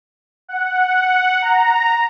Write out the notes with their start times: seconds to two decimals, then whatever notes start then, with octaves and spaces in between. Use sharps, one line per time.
0.48 F#5
1.42 A#5